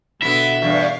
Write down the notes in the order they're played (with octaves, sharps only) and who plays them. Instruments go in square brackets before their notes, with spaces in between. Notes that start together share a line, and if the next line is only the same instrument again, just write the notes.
[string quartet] B2 D3 F#4 [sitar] B3 E4 [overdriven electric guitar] E5
[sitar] E2 G2 [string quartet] F5